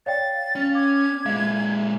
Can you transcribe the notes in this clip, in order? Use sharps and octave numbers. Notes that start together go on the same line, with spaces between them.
C#5 D5 F5 G5 A6
C#4
D6 G#6
A#2 G#3 E5 F5